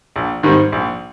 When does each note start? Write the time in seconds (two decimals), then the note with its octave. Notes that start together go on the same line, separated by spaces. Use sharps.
0.16 A#1
0.43 G#2 D#3 G3 C4
0.72 A#1